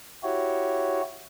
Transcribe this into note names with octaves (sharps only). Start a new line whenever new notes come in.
E4 F#4 G4 C#5